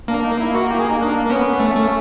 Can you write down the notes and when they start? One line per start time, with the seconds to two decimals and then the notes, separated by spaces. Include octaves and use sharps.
0.08 A#3 D4
0.23 D#4
0.40 E4
0.54 F#4
0.70 G4
0.79 G#4
0.89 D#4
1.00 D4
1.30 B3 C#4
1.60 A3
1.76 A3